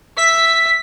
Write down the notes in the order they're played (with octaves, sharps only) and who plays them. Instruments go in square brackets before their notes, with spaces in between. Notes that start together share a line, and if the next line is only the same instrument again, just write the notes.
[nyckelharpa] E5 [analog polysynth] B6